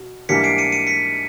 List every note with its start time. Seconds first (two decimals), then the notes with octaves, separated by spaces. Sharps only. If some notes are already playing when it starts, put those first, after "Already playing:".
Already playing: B2
0.29 G#2 E3 G3 A#3 D4 B6 C#7
0.44 C7 D7
0.58 C#7 D#7
0.72 C#7 D#7
0.87 B6 C#7